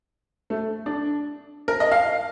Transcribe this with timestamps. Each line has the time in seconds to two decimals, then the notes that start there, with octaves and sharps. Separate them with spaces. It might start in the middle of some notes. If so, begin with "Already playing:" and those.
0.50 A3
0.86 D4
1.68 A#4
1.80 D#5
1.92 F5